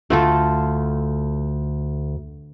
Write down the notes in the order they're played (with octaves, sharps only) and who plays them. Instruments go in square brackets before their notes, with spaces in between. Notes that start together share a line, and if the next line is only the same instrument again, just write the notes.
[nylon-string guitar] D2 [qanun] A3 F4 A4